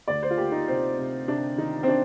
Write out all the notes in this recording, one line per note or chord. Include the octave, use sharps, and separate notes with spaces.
D2 D5
C5
F4
A#3 G4
D#4
C3 C4
C3
C3 D4
D#3 D#4
C4
D4